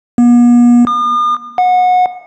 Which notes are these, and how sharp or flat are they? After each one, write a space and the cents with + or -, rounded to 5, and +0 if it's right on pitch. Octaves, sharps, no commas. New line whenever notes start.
B3 -45
D#6 -45
F#5 -25